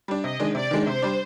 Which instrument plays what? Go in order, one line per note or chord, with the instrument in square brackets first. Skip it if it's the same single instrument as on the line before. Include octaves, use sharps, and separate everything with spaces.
[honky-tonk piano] G3 D4
[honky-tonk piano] C3 [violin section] D#5
[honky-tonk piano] D#3 G#3 D4
[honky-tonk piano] C3 [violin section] D5
[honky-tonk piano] D#3 G#3 D4
[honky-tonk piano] C3 [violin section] C5
[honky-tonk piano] G3 D4